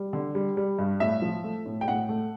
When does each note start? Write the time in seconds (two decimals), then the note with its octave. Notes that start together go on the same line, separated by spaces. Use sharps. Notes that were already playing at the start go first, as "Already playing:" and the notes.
Already playing: G3
0.13 D3
0.35 G3
0.57 G3
0.79 G2
1.00 A2 E5
1.22 F3
1.44 A3
1.66 A2
1.81 G5
1.88 A2 F#5
2.09 A3